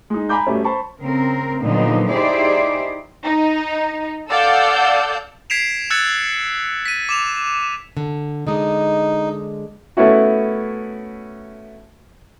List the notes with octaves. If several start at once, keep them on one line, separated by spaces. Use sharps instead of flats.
G#3 D#4
G#5 A#5 B5 D6 G6
B2 G3 A3 C#4
C5 A5 B5 C#6
C#3 C4 A#4
A#2 D3 F3 F#3 B3 D#4
D#4 E4 G4 G#4 C5 D5
D#4
A4 D5 F5 F#5 E6 G6
G#6 B6 C7 D7 E7 F7
E6 F#6 G#6 A6 C#7 E7
B6 D#7
D6 E7 F7
D3
D3 G#3 D#4
A3 B3 C#4 E4 F#4